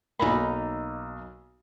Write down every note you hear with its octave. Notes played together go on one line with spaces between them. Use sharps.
B1 A#3 D#4 A#5 B5